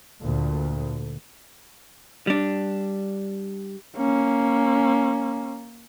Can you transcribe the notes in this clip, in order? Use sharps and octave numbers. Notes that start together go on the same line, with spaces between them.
D2 A#2
G3 D4
A#3 C#4